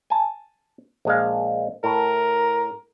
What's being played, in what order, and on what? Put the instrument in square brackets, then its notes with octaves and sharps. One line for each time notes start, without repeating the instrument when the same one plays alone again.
[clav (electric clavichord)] G#5 A5
A#1 G#3 F5
[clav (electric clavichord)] A2 [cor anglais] A#4